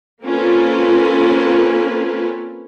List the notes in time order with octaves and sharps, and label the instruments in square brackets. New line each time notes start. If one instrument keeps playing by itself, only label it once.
[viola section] A#3 C4 C#4 F4 A4 B4